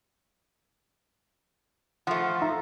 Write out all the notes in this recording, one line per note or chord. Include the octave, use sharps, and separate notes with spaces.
F3 A3 F#5
D#4 E5 A#5